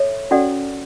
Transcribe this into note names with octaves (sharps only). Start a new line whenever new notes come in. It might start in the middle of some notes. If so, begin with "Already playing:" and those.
Already playing: A4 C#5 E5
C#4 F#4 A4 D5 F#5